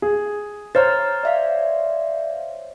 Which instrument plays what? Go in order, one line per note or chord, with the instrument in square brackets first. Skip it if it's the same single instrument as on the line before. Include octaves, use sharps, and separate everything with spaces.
[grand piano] G#4
[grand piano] C5 C#5 [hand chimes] A#5 F6 A6
[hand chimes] D5 E5 F5